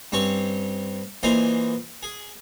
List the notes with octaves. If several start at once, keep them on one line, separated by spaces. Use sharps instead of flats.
G2 C4 C#4 A5 C#6
A#2 E3 C5 D#5 F5 G#5
G#4